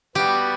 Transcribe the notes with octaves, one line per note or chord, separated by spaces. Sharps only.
G3 B3 F#4 G4